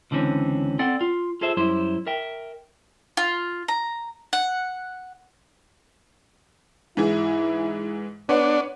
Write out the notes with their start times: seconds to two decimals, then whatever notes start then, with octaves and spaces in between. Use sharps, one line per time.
0.11 C#2 D3 E3 C4 C#4
0.79 C4 A4 D5 F#5 G5
1.01 F4
1.41 F4 G#4 A4 C5 E5
1.57 F#2 G3 E4 C5
2.07 A#4 E5 G5
3.17 F4
3.68 A#5
4.33 F#5
6.97 G#2 E3 E4 G#4
8.29 B3 D4 B4 C#5 F#5